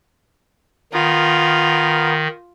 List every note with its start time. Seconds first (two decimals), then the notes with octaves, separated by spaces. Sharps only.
0.93 D#3 B3 F4 A#4